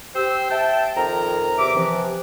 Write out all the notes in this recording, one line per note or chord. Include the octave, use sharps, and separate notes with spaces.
G4 C5 E6
E5 G5 A5
F2 D#3 A#4 A#5
E2 C3 E5 D6
C3 E3 F3